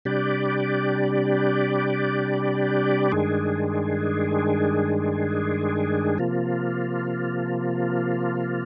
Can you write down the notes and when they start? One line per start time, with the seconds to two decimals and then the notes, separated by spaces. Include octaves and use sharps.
0.05 C3 G3 D4 G4 D5
3.12 G2 D#3 G#3 D4 G#4
6.18 C3 F3 A#3 F4